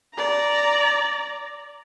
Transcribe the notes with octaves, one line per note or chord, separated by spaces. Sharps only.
D5 A#5